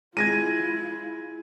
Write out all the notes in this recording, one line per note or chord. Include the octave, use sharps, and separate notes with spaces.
G#3 E4 F4 G#6 A#6 D#7